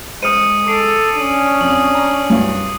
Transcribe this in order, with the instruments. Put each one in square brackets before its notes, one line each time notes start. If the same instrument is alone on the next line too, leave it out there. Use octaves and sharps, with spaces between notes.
[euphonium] G#3 [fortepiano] C5 F6 [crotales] D#6 C#7 D#7
[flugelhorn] A4 [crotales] D6 C7 D7
[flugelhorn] C#4 [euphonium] D4 [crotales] D#7 F#7
[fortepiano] F2 [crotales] D#6 F#7
[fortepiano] A#5
C2 G2 F#3